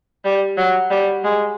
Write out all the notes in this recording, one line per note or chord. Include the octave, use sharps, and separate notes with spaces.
G3
F#3
G3
G#3